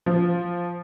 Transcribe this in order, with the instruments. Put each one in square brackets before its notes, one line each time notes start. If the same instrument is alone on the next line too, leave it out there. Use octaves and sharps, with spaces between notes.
[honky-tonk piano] F3